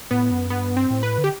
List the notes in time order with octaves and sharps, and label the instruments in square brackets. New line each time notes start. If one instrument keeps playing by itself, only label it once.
[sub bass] A2 [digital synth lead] B3
[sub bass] F#2
[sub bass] G2 [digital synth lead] B3
[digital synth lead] C4
[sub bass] A2
[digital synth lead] B4
[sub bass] D3
[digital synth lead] G4